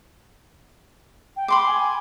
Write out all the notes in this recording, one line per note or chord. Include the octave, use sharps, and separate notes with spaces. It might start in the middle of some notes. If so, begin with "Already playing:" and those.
G5
B5 C6 D6
G#5